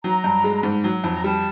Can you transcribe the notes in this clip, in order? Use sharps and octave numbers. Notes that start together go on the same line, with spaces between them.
F#3 A#5
G2
G#3
G#2
F#3
F2
A#5
G3 A5